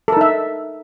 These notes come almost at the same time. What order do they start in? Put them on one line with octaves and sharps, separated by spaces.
A4 A#4 D#4 E5